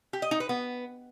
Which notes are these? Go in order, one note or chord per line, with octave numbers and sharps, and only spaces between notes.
G4
D#5
D#4
B4
B3